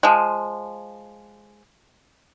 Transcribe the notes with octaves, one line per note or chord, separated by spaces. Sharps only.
F3 G#3